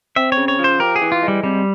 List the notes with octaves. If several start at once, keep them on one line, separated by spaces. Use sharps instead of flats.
C4 E5
C#5
C#3
C#5
F3
C5
G4 A#4
G#4
E3
F4
G#3
G3
C3 G3